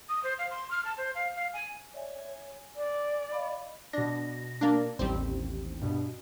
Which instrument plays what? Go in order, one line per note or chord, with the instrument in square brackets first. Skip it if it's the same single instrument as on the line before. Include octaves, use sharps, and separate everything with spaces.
[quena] D#6
C5
F5
C6
F6
A5
C5
F5
F5
G#5
[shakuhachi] C#5 [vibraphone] D5 E5 G#5
[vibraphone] G#5
[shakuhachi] D5
[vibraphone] D#5 F5 B5
[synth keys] B2 A#6 [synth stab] D4
[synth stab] A#3 D4
[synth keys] A1 D#2 [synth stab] G3 C4
[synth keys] G2 B2